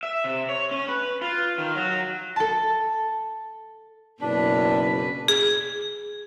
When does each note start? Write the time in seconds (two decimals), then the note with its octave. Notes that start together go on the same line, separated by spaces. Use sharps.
0.03 E5
0.24 C3
0.49 C#5
0.71 C#4
0.88 B4
1.21 F4
1.58 D#3
1.75 F#3
2.36 A4 A5
4.21 F#1 B2 D4 B4
5.28 G#4